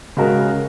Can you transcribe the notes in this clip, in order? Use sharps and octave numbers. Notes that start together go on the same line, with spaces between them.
C#3 G#3 F#4 A#4